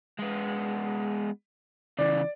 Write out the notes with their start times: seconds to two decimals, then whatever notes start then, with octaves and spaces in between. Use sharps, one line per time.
0.19 G#3 B3
1.99 C#3 E3 D5